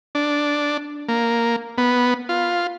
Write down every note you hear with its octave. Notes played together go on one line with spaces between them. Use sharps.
D4
A#3
B3
F4